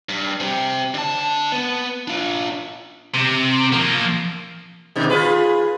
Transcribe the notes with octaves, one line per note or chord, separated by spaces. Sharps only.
G2
C4 G4
D3 A5
B3
D4 F4
C3
F3 A#3
G#2 B2 D#3
F4 G#4 B4